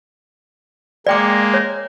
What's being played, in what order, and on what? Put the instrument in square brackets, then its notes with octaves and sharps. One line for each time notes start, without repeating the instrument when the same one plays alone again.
[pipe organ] G#3 A#3 [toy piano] D5 G5 D6
[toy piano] C#5